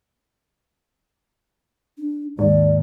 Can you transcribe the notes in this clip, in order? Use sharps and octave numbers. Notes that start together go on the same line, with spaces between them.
D4
D#2 G#2 D5